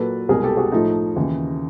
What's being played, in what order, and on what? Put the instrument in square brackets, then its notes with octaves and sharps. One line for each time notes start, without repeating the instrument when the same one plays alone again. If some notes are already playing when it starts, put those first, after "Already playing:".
Already playing: [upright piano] A#2 F#3 A#3 A4 B4
C2 B2 G#3 G#4 A#4
G4 A4
F#4 G#4
A2 F3 A3 D#4 F4
D#2 C#3 E3